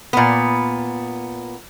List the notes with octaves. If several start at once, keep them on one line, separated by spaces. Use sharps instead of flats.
A#2 B3